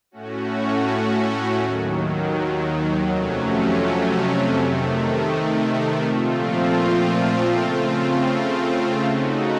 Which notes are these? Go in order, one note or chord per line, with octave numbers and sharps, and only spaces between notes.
A2 A3 C#4 F#4
D#2 D#3 F#3
F2 C3 F#3 A3 C#4
C3 D#3 A3
A#2 F3 A3 C4 F4
C#3 A3 C4 F4
C#3 A3 D#4 F#4